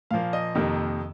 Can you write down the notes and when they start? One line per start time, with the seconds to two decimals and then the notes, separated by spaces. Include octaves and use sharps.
0.11 A#2 F3 A#3 F5
0.33 D#5
0.55 F2 C3 D#3 A#3